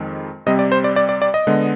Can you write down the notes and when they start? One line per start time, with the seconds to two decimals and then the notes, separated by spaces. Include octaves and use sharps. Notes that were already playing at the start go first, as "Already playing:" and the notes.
Already playing: F2 D#3 G#3 C4
0.46 C3 G3 C4 D#5
0.59 D5
0.72 C5
0.84 D5
0.96 D5
1.09 D5
1.22 D5
1.34 D#5
1.47 D3 G#3 B3